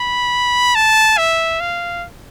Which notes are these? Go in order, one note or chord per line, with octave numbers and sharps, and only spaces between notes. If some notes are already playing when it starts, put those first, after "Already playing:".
Already playing: B5
A5
E5
F5